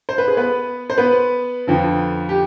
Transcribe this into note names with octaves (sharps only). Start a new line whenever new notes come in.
C5
B4
G#4
B3 B4
C5
B3 B4
F2 D3 F3
G4